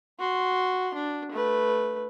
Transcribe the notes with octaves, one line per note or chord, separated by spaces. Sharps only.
F#4 C6
D4
A3 B4